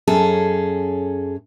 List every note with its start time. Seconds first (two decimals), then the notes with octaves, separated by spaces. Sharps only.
0.07 F#2 C#4 G#4 A4